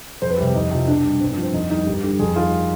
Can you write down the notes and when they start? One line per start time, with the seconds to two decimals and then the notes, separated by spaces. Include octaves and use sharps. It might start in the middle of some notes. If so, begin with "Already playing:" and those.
0.22 F2 C5
0.30 B4
0.38 C3 G3
0.46 G4
0.55 F2 D#4
0.71 C3 F3
0.88 B2 D4
1.04 G3
1.21 G2 C4
1.32 D4
1.37 F3
1.43 C4
1.53 F2 D#4
1.70 D#3 G3 D#4
1.86 G2 G4
2.03 D3 G3
2.20 F2 G#4
2.36 D#3 G3 F4